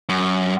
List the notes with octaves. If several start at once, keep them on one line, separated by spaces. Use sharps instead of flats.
F#2